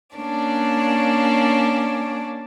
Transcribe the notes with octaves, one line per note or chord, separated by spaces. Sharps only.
A#3 C#4 D4 D5